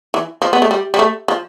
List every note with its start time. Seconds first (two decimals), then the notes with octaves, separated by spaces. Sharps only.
0.14 E3
0.42 F3
0.53 B3
0.62 A3
0.71 G3
0.94 G3
0.99 A3
1.28 F3